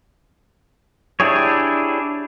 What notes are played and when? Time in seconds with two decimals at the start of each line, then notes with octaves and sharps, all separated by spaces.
1.20 D4 E4 G4 G#4 C#5